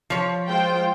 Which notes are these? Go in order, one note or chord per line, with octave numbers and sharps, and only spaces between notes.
F3 C#5
G#3 F4 C5 G5